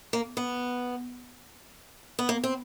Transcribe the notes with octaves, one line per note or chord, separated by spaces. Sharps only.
A#3
B3
B3
A#3
C4